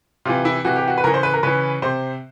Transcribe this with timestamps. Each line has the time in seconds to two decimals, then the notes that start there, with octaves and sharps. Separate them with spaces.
0.25 C3 E3 F4
0.45 E4
0.65 C3 E3 F#4
0.76 G4
0.87 F#4
0.98 B4
1.04 C#3 E3 A#4
1.14 C5
1.23 B4
1.34 A#4
1.43 C#3 E3 B4
1.82 C3 C5